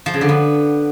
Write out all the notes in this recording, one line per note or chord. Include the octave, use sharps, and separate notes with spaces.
F3
C#3
D3
B3